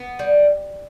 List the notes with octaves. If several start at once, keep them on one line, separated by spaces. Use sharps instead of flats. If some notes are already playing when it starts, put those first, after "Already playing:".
Already playing: B3
G3